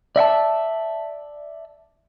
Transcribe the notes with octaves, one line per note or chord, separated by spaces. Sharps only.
D5 E5 F#5 A5